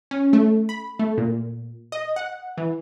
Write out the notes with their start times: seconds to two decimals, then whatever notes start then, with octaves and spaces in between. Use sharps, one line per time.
0.11 C#4
0.33 A3
0.69 B5
0.99 A3
1.18 A#2
1.92 D#5
2.16 F#5
2.57 E3